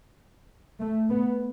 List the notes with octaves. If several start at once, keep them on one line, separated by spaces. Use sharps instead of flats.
A3
B3